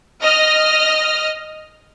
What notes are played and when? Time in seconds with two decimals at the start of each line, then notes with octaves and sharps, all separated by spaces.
0.22 D#5 F6